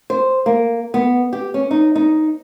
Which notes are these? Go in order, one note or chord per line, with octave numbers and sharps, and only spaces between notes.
C5
A#3
B3
G4
C#4
D#4
D#4